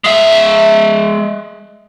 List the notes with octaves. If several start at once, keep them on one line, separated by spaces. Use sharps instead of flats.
G#3 E5